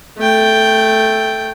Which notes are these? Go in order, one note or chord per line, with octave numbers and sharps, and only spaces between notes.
A3 G5